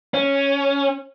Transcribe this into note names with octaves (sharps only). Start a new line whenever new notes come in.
C#4